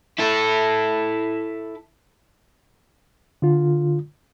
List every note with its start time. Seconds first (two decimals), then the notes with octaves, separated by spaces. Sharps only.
0.19 E4 A4
3.42 D3 F4